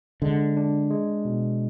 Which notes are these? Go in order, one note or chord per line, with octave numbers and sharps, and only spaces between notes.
D3 G#3
D4
G#3
B2